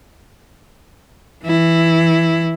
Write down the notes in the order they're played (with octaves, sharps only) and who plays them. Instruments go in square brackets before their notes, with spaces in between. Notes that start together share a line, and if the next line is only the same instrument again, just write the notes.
[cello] E3 E4